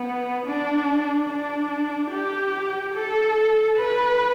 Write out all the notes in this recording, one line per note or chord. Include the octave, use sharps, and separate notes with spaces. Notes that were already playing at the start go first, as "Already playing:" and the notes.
Already playing: B3
D4
D4
G4
A4
B4